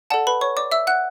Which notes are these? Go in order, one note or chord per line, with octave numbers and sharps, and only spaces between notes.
A4 D5 F#5 A5
B4 B5
C#5 C#6
D5 D6
E5 E6
F#5 F#6